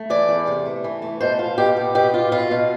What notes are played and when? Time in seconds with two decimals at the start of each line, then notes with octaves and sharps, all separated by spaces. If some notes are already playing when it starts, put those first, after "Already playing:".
Already playing: A3
0.10 E3 D5
0.29 E2
0.47 C3
0.66 A3
0.84 E3
1.02 A3
1.20 B2 C5
1.39 F4
1.58 B2 G4
1.77 B3
1.95 B2 G4
2.14 F4
2.32 B2 F4
2.51 B2